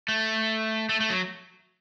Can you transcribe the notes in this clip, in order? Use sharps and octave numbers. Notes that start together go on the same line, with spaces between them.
A3
A3
A3
F#3